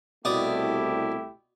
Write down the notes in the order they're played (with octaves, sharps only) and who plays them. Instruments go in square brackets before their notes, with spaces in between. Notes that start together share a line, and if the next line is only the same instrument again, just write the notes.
[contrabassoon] C2 [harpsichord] B2 D5 D#6 [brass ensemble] A3 E4 G4